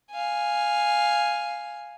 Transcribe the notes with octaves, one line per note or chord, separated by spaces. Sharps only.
F5 G#5